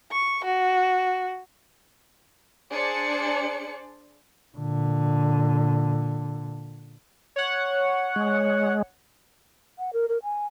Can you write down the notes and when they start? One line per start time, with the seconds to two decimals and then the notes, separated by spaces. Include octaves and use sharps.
0.11 C#6
0.45 F#4
2.72 D4 G#4 C5 D5 C#7
4.57 A#2 D3
7.36 C#5 F#5
8.16 G#3
9.78 F#5
9.93 A#4
10.09 A#4
10.23 G#5